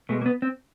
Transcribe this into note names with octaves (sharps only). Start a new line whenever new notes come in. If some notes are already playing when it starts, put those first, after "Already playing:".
B2 G#3 A3
A#3
B3
C4